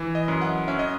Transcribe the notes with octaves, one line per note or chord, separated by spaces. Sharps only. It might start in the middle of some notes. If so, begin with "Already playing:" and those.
Already playing: E3
D#5
F#2
F#5
C#4 E5
D#5